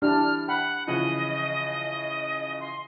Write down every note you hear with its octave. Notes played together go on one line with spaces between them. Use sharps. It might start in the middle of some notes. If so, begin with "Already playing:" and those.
E3 D4 G4 F6
F#5 G5 B5
C#3 E3 F3 D#5
C6